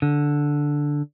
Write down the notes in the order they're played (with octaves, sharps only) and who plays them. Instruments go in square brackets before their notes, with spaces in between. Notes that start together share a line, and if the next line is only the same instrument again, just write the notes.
[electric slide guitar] D3